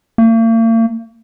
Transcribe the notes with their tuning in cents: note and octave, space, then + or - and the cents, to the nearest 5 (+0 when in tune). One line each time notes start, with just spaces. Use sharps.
A#3 -45